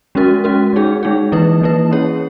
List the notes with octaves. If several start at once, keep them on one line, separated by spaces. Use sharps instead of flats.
G#3 C#4 F#4 A#4
G#3 C#4 F#4 A#4
G#3 D#4 G#4
G#3 D#4 G#4
E3 A#3 E4 B4
E3 A#3 E4 B4
C#4 G#4 C#5